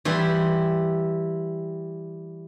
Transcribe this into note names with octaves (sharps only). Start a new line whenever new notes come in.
E3 G3 E4 C6